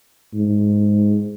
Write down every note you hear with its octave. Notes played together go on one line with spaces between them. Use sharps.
G#2